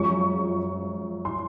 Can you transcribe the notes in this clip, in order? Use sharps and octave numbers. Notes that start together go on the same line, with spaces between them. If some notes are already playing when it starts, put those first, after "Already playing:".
Already playing: F#2 F3 G#3 C#6
C6